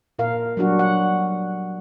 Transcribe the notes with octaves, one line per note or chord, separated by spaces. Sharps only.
A#2 A#4 F5
F#3 G3 D4 F#4
F#5